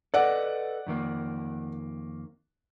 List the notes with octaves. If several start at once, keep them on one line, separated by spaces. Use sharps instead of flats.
A4 B4 D5 D#5 F#5
F2 D#3 A#3